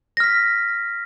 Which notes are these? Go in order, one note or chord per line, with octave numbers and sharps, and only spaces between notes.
F6 A#6 B6